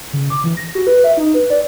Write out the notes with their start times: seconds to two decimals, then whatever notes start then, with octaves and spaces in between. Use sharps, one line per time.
0.13 C#3
0.30 D6
0.44 E3
0.57 A#6
0.75 F#4
0.87 B4
1.04 E5
1.17 D#4
1.34 B4
1.50 D5